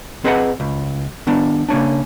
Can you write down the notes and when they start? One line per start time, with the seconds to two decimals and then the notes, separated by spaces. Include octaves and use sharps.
0.24 C4 G#4 B4 D#5 F5 F#5
0.60 C#2
1.27 D#3 B3 D4
1.69 C#3 A#3 C#4 D4